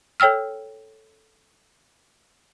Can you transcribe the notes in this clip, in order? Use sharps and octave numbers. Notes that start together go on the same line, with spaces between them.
A4 C#5 G5 E6 F6